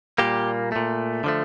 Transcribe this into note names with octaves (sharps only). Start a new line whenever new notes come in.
A#2 G3 A#3 G4
A#2 A3
D3 F3 A3